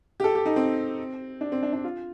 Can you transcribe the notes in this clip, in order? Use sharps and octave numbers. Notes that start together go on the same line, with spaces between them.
G4
A4
G4
D#4
C4
D4
C4
D4
D4
F4